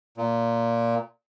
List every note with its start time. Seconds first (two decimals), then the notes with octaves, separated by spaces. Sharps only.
0.17 A#2